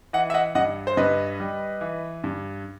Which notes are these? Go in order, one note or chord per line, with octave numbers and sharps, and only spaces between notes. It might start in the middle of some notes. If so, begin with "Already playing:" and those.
E3 D#5 F#5
E5
D#5 F#5
G2 D#5 F#5
C5
G2 B4 D#5
G3
E3
G2